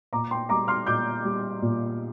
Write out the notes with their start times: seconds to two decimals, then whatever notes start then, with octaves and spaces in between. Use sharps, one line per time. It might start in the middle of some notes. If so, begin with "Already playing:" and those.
0.13 A#2 A#5 D6
0.31 G5 C6
0.49 G3 A#5 D6
0.68 C6 F6
0.87 A#2 D6 G6
1.24 G3
1.62 A#2